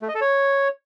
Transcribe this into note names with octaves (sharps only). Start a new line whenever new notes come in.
A3
D#5
A4
C#5